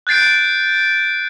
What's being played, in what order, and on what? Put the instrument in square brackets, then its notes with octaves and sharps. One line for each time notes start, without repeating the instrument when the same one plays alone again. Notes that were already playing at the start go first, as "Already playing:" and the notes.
[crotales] F#6 G6 A6 C7 D7